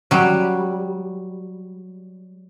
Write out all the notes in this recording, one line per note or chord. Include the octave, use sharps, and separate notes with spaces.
F#3 G3